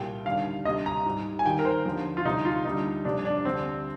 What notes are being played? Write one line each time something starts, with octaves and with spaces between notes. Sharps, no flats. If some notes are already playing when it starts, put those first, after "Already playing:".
Already playing: C2 A#2 G3 G5
D#2 D3 G3 F5
D2 C3 G3 D#5
A#5
G#2 G3
G#5
D#2 D#3 G3 G5
A#4
C5
D#2 D3 F3
F4
D2 C3 G3 D#4
F4
D2 D3 G3 D#4
F2 C3 G3 D4
D4
D2 D3 G3 C4